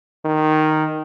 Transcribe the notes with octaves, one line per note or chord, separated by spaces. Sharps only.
D#3